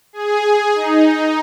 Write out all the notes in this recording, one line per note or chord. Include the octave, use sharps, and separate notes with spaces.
G#4
D#4